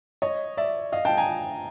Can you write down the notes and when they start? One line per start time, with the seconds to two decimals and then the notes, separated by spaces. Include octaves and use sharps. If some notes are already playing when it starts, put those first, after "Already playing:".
0.22 C#5 D#5
0.57 D5 E5
0.92 D#5 F5
1.05 G5 A5
1.17 G#5 A#5